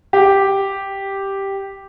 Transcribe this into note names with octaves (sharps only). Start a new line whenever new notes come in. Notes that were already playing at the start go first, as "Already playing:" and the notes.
G4